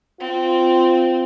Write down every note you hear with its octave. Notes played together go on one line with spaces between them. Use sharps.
C4 F4